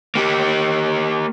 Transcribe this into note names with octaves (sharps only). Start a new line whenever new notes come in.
A#3 G4